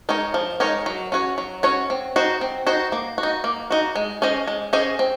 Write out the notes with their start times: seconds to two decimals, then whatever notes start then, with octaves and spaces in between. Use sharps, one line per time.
0.09 G#3 D#4 A#4 C#5
0.34 F3
0.60 G#3 D#4 A#4 C#5
0.86 F#3
1.12 C#4 F#4 C#5
1.38 F#3
1.63 C#4 F#4 C#5
1.90 C4
2.16 D#4 F#4 C5
2.41 C4
2.67 D#4 F#4 C5
2.92 A#3
3.18 F#4
3.23 D#4
3.44 A#3
3.71 D#4 F#4
3.96 G#3
4.22 C#4 G#4 C5 D#5
4.48 G#3
4.73 C#4 G#4 C5 D#5
4.99 C4